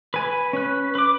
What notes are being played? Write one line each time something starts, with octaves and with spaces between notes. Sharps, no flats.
B4 G#5
C#4 B4
B4 D6